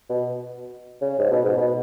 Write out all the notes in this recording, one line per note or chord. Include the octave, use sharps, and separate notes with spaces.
B2
C#3
G#2
B2
G#2
B2